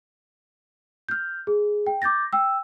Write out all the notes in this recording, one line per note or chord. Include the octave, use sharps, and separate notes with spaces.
F6 G6
G#4
G5
D6 G6 A6 A#6
G5 E6